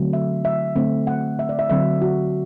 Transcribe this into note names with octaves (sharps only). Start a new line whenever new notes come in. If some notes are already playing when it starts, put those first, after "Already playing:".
Already playing: D3 F#3 A3 C4
E5
E5
D3 A3 C4
F#5
E5
D5
E5
D3 F#3 C4 E5
F#4